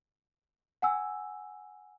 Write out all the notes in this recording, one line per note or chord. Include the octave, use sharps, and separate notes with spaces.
F#5 G#5 E6